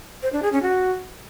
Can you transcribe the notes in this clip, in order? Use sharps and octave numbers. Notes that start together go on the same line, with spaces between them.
C5
D4
G#4
C#4
F#4